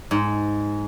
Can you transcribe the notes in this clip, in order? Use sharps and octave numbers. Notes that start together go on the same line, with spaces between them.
G#2